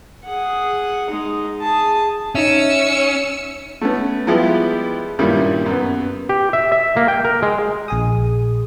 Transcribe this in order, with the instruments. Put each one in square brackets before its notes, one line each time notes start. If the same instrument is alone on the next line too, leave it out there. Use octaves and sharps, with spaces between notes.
[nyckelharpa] G#4 F#5
G#3 D#4
G#4 A5
[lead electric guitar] C#4 [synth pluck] D#4 E5 [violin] E6 C#7
[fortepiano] A3 B3 C#4
F3 G3 G#3 B3 E4 G4
G2 A#2 D#3 G3 C#4 E4
F#2 B3
[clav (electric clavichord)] G4
E5
E5
A#3
G5
A#4
G#3
[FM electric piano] A#1 G#4 D#6